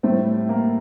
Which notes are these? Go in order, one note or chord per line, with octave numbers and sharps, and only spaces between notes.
A2 G3 A3 C4
A#3